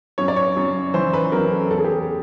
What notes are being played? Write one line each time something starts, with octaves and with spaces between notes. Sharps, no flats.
F#2 C#5
D5
C#5
F#2
E3 C5
B4
F#2 A#4
A4
E2 A4
G#4
G4
G#4